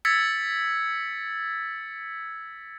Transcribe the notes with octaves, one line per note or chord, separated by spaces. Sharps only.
E6 G#6 A6 B6 C#7